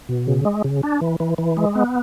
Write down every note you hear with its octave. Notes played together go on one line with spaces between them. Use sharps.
B2
C#3
G#3
C#3
D4
E3
E3
E3
G#3
B3